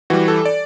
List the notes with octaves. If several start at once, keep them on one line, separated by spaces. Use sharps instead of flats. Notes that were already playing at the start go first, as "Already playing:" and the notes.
E3 G3 F#4
A4
D5